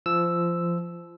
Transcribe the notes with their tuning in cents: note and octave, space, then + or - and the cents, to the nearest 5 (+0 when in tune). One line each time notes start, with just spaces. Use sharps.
F3 -20 E6 +0